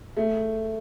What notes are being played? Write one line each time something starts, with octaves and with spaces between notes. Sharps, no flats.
A3